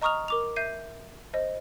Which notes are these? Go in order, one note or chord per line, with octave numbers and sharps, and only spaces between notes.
D#5 A#5 C#6 D#6 F6 F7
A#4 D6 F7
E5 G6 C7 D#7
C5 D#5